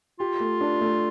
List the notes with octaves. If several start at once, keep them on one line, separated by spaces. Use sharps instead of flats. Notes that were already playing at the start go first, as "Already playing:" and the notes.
F4 G4
A3
D4
A3